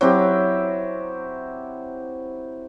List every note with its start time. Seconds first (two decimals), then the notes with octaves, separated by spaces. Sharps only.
0.01 F#3 C4 E4 G4